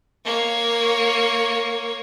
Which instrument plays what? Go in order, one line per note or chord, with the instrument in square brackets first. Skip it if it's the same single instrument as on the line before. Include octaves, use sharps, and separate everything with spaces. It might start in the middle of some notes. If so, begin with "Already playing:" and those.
[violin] A#3 C#5